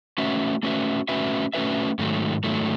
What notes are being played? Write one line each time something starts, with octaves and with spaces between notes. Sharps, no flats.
A3 C#4 F#4 B4 E5
A3 C#4 F#4 B4 E5
A3 C#4 F#4 B4 E5
A3 C#4 F#4 B4 E5
G#2 D#3 F#3 A3
G#2 D#3 F#3 A3